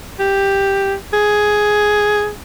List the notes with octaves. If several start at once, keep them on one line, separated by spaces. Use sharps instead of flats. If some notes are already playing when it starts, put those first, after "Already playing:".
G4
G#4